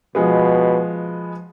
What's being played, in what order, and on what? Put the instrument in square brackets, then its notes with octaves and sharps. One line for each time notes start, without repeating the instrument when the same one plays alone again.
[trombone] B2 [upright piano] F3 G#3 B3